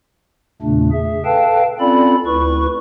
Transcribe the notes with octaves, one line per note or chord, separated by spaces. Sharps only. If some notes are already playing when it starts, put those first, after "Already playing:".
E2 A#2 C#3 A3 D4
G#4 E5
A4 B4 F5 G5 A5
C4 C#4 F4 A4 D5 B5
D2 E4 B4 C#6